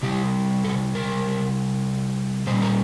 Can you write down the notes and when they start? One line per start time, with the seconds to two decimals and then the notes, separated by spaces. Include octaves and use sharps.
0.03 C3 G3 G4
0.64 A4
0.95 A#4
2.47 A#2 G3 C5
2.62 A#4